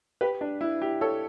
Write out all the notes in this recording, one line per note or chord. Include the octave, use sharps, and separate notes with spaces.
G4 B4
D4
E4
E4 G4
A4 C#5